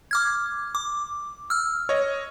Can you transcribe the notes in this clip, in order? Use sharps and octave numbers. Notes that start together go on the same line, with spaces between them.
D6 F6 G#6
D6
E6 F6
C#5 D#5